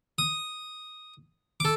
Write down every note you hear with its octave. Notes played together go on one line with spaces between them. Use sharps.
D#6
A4 D6